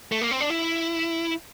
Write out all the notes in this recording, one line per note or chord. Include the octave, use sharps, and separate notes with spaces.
A3
A#3
C4
D4
E4